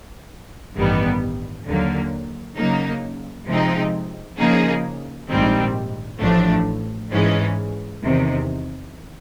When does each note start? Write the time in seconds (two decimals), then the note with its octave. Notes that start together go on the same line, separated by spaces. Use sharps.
0.75 A1 G2 D#3 G3 B3
1.67 D#2 D3 F#3 A#3
2.57 C#3 F#3 A#3 D#4
3.48 C3 F3 G#3 C4 D#4
4.38 C#3 F3 A#3 D#4 G#4
5.30 A#1 G#2 D#3 G3 C4
6.20 A1 A2 F3 A3 D4
7.11 G#2 E3 G#3 C#4
8.02 E2 C3 D#3